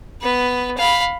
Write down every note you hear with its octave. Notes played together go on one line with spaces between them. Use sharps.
B3 B4
F5 B5